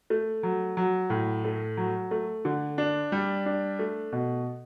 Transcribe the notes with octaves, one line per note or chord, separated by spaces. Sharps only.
A3
F#3
F#3
A2
A3
F#3
A3
D3
D4
G3
D4
A3
B2